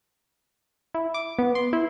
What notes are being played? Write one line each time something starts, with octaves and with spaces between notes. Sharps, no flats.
E4
D6
B3
C6
E4